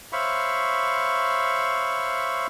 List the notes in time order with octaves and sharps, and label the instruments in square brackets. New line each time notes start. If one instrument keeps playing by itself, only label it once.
[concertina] C5 C#5 E5 F5 B5 C#6